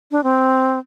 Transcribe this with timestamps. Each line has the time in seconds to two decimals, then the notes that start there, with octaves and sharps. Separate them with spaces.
0.11 D4
0.24 C4